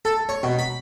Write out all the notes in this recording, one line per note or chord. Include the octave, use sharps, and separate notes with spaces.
A4
C#5
B2
B5